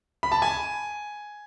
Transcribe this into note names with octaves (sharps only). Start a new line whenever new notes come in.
B5
A5
G#5